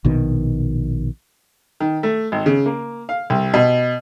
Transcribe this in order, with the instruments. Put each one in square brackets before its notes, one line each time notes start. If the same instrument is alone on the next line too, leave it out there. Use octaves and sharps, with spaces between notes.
[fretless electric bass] A#1 B2 D#3
[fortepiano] D#3
A3
G#1
C#3
A#3
F5
C2
B2